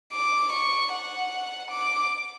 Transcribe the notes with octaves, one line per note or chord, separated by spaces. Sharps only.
D6
C#6
F#5
D6